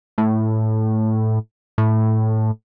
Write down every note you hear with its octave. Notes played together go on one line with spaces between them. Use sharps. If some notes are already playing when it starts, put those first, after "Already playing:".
A2
A2